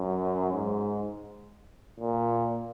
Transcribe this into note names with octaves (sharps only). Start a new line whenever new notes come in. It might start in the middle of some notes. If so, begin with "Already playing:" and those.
Already playing: F#2
G#2
A#2